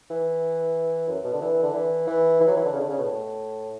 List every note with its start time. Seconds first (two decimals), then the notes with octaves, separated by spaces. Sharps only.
0.10 E3
1.08 F#2
1.24 B2
1.33 D3
1.41 E3
1.62 D3
1.74 E3
2.07 E3
2.40 E3
2.47 F#3
2.56 E3
2.64 D3
2.72 C#3
2.80 D3
2.88 C#3
2.98 B2
3.05 A2